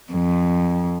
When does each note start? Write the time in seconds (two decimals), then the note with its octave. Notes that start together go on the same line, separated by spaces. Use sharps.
0.13 F2